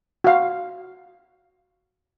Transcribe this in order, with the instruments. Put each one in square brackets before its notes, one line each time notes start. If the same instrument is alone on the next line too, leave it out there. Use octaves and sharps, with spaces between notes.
[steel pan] F#4 F5